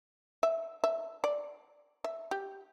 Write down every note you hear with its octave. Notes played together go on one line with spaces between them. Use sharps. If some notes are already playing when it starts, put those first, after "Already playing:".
E5
E5
D5
E5
G4